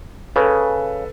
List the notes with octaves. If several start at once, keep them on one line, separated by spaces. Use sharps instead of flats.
C#3 A4 B4